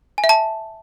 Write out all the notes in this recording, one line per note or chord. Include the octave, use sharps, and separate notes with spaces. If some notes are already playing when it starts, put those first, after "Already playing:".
G#5
E5
A5